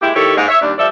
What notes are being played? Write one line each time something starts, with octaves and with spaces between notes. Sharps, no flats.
G#3 A#3 E4 G4
D#3 E4 G4 A4 C#5
G#2 G#3 A#3 D#4
C#5 E5
D#2 G3 D4
F3 G3 A4 D5 E5